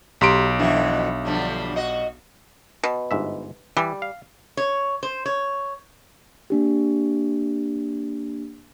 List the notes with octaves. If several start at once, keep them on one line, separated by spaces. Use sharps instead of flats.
B1 G4 A#5 C6 B6 D7
F2 E3 D4 F#4 E5
D3 F3 G3
F#4 D#5
B2
G1 G#2 E5
E3 G3
F5
C#5
C5
C#5
A#3 D4 G4